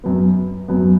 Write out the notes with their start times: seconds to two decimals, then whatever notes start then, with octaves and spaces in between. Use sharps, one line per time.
0.04 F#2 F#3 B3
0.68 F#2 F#3 B3